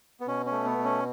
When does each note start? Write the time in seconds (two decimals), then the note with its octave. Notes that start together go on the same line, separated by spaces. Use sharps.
0.20 B3
0.27 B2 C#4
0.46 C#4
0.52 A3
0.65 B3
0.78 B2
0.84 C#4